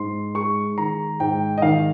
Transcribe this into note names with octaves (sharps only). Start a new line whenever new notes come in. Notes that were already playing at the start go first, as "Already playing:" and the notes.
Already playing: G#2 C6
G#3 C#6
D#3 A#5
G#2 G5
D#5
D#3 F5